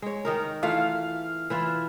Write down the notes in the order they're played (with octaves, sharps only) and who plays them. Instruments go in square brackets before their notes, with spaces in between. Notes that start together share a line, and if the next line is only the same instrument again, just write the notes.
[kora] G#3 C#5
D#3 D#4 A#4
[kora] E3 A3 F4 [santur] F5
[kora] E3 E4 F4